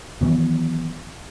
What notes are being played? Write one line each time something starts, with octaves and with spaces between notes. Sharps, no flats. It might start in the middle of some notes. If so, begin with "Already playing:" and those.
D#3 E3 F#3 B3